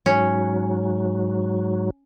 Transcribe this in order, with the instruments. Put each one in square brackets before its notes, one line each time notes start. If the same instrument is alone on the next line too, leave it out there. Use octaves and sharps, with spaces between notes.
[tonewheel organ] G#2 F#3 [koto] C#4